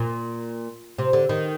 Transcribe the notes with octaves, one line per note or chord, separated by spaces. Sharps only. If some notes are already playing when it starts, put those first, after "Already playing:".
Already playing: A#2
C3
D3
D#3